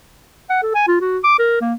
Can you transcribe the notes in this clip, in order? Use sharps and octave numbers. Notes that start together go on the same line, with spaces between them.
F#5
A4
G#5
F4
F#4
D6
A#4
A#3